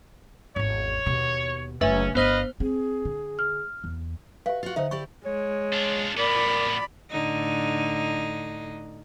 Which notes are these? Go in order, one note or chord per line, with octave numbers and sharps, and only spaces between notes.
G#1 E2 C#5
D#2 B2
F#1 A3 C#4 B4 E5
G1 B3 D4 B4 C5 D#5 F5 F6
C4 G#4
D3
F6
E2
F#4 G4 B4 E5 F5
F4 F#4
D3 D#4 C5 E5 F#5
E4 G4 D5 C#6
G#3 C#5
D4 F4
A2 B3 A#4 D5 B5
A2 D3 D#4